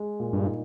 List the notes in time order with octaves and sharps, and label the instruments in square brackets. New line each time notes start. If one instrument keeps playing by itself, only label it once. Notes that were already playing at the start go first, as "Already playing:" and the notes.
Already playing: [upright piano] G#3
A#2
[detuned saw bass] G2
[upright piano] D#4